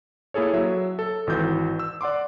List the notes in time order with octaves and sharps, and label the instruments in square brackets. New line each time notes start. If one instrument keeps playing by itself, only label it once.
[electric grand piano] A#3 E4 G#4 A4 C#5
F#3 E5
A4
G#1 E3 F#4 G6
E6
D5 F#5 C6 D6